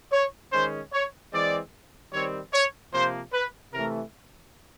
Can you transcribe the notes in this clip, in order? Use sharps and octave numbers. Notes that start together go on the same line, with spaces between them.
C#5
D#3 G#3 C#4 C5
C#5
E3 G#3 C4 D5
D#3 G3 C4 C#5
C#5
C3 F3 A#3 C5
B4
C3 E3 A3 A#4